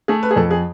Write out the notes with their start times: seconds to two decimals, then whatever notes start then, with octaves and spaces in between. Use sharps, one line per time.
0.08 A3 G#4
0.23 B4
0.31 G#4
0.36 F2 A4
0.51 G#4